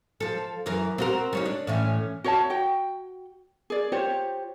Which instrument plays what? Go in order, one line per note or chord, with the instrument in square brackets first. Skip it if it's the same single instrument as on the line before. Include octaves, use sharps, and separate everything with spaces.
[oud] F3 A4
F#2 E3 A#4
C4 F#4 A#4
G3 C#4 D#4
D4
A2 E3 C#4
[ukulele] F#4 C#5 E5 A5
F#4 G5
G#4 D5
F4 G4 C5 C#5